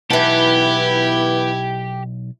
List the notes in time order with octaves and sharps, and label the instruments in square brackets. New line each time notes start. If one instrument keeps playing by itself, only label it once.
[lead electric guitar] B1 A5 [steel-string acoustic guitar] E3 B3 [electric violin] E4 G#6 [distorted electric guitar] G4